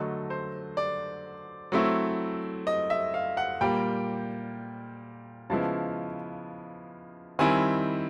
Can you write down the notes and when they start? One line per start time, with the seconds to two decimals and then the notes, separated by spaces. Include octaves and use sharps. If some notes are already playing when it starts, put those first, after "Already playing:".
Already playing: D3 F#3 A3 D#5
0.30 C5
0.77 D5
1.72 F#3 A3 C4 E4
2.67 D#5
2.90 E5
3.14 F5
3.37 F#5
3.61 A#2 G3 A#3 G5
5.50 C#3 F3 G#3 B3 E4 A5
7.39 D#3 G3 C4 E4 G#5